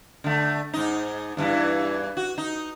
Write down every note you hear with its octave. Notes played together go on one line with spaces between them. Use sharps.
D3 A3
G#2 D#4
E2 G2 E3
F#4
D#4